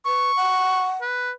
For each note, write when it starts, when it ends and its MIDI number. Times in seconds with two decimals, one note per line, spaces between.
0.06 0.32 71
0.06 0.92 85
0.36 0.99 78
1.01 1.31 71